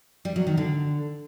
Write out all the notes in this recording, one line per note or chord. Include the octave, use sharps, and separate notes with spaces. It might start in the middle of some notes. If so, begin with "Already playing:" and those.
G3
F#3
D#3
D3